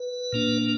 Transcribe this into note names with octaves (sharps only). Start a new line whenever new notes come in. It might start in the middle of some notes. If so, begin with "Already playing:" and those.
Already playing: B4
A#2 A#3 D4